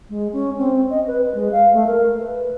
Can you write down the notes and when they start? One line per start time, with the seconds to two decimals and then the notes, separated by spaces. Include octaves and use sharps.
0.10 G#3
0.33 C#4
0.58 C4
0.90 D#5
1.07 B4
1.22 B4
1.35 G#3
1.52 F5
1.73 A3
1.87 A#4
2.20 B4